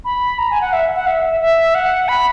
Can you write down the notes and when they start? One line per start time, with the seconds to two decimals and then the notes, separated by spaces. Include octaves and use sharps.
0.05 B5
0.38 A#5
0.50 G#5
0.61 F#5
0.73 E5
0.96 F#5
1.07 E5
1.41 E5
1.75 F#5
2.08 B5